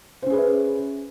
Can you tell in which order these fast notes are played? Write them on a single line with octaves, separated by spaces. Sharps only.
C5 C#4 G#4 B4 E5